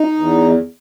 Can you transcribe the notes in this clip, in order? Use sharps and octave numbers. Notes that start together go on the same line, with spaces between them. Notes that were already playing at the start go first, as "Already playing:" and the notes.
Already playing: D#4
E2